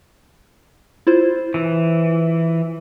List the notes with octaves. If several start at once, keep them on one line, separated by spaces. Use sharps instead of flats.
E4 F4 C5
E3